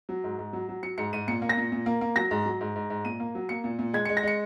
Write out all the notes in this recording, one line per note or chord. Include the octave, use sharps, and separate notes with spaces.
F#3
G#2
G#2
F#3
F#3
F#3 C#7
G#2 C#7
G#2 D#7
A#2 C#7
A#3
A#6
A#2
A#2
A#3
A#3
F#3 A#6
G#2
F#3
G#2
G#2
G#2
A#2 D#7
A#3
F#3
A#3 C#7
A#2
A#2
G#3 G#6
G#3 C#7
A#6
G#3 C#7